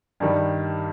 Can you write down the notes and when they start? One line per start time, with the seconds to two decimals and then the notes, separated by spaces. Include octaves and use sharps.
0.20 G2 D#3 G3